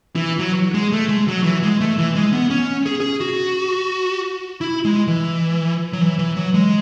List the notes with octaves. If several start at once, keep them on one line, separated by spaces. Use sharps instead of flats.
E3
F#3
G#3
A3
G#3
F#3
E3
G#3
A3
E3
G#3
B3
C#4
G#4
G#4
F#4
E4
G#3
E3
F#3
E3
E3
F#3
G#3